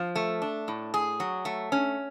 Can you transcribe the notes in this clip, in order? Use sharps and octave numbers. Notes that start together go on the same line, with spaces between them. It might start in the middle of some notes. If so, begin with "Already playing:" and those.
Already playing: F3
A3
D4
A2
G#4
F#3
A3
C#4